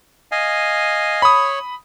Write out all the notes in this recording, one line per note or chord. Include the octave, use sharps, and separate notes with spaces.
D#5 F5 G#5
C#5 B5 D#6